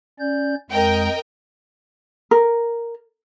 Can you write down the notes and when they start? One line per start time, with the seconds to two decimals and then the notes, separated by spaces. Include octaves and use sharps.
0.20 C#4 D5 G6
0.70 F2 G#3 A#4 D#5 G5
2.31 A#4